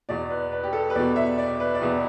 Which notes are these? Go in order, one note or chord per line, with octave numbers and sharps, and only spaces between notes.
E2 B2 D5
B4
B4
G4
A4
B4
E2 B2 D5
E5
D5
B4
D5
E2 B2 B4